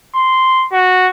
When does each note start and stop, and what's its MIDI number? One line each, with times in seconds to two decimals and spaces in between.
0.15 0.67 84
0.72 1.09 66